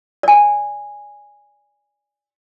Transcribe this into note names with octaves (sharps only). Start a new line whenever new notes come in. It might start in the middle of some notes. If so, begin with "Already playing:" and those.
D5 G#5